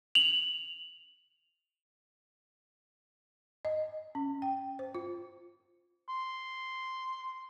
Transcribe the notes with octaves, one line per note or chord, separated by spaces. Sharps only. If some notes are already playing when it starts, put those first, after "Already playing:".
F7 F#7
D#5
C#4
G5
C5
F4
C6